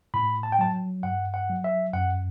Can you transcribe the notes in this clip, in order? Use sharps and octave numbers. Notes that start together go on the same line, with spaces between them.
A2 B5
A5
G5
F#3 A5
G2 F#5
F#5
F#3
E5
F#2 F#5